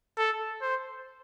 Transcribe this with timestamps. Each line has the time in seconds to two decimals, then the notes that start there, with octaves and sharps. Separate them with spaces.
0.17 A4
0.62 C5